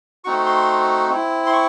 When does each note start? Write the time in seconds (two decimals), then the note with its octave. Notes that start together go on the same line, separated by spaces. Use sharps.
0.24 A3 C4 D#4 F#4 C#6
0.46 C6
1.10 C4 E4
1.46 C6
1.53 C#6